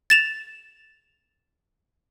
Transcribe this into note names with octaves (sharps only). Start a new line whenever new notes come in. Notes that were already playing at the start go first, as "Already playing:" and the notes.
A6 E7 F7